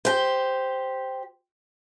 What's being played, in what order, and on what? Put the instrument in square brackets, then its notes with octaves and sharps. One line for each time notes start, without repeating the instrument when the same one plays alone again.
[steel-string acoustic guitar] G4 C5